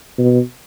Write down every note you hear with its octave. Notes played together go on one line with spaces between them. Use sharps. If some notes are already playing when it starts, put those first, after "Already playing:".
B2